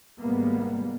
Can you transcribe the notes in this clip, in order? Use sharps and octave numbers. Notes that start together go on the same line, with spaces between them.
G#1 C3 G3 G#3 A#3 B3